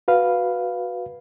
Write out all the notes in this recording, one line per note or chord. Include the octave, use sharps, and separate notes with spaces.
F#4 B4 F5